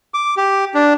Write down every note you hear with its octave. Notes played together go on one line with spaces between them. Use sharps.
D6
G4
D4